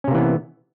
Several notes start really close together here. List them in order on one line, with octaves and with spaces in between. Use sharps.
C#4 C3 A#3 E3 B3